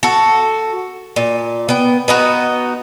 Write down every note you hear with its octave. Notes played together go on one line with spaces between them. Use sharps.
F#4 A4
A#2
B3 G5
B3 D#4 F#4